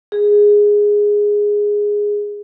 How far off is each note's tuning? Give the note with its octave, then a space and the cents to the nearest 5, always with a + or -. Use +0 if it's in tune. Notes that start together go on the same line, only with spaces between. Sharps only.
G#4 -5